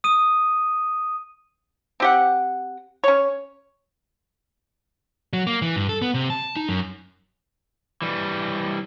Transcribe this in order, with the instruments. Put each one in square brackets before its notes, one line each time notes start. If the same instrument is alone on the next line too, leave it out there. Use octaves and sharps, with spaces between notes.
[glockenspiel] D#6 D#7
[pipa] C4 G4 F#5
C#4 C#5
[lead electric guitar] F#3
A#3
E3
G2
A4
B3
C3
A5
D#4
F#2
[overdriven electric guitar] E3 G3